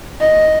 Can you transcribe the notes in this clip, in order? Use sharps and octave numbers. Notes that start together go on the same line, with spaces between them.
D#5